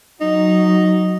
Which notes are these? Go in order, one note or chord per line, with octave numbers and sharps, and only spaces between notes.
F#3 D#4